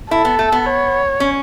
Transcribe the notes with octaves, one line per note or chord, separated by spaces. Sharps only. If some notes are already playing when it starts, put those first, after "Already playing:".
E4 A4
B3
A3
B3
C#5
C#4